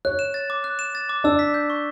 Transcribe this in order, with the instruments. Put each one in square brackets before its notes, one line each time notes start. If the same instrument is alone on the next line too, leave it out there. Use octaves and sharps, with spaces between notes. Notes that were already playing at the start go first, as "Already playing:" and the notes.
[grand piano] C#5 [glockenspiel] F#6
[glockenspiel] E7
A6
D6
F#6
E7
A6
D6
[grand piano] D4 [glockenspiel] E6
[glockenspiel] B6
G6
C#6